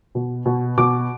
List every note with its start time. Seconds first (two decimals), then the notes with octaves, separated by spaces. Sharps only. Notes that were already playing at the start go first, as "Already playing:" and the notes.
0.15 B2
0.46 B2
0.78 B2 D6